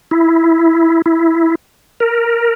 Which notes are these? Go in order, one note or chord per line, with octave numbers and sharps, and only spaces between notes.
E4
E4
A#4